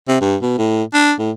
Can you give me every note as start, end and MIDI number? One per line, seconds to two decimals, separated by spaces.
0.08 0.18 48
0.21 0.36 43
0.42 0.53 47
0.58 0.83 45
0.93 1.13 62
1.19 1.31 45